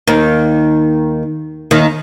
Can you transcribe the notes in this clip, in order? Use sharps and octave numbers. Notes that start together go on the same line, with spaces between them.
D#2 D#3
D#2 D#3